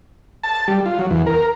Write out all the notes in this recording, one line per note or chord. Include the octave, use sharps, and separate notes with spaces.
A5
G3
F4
F#3
E2
A#4